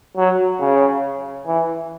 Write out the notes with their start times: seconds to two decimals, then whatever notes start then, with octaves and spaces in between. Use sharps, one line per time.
0.17 F#3
0.60 C#3
1.47 E3